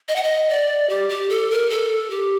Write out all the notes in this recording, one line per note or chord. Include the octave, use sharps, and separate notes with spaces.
D#5
F#5
D#5
D5
G4
G4
A4
A#4
A4
G4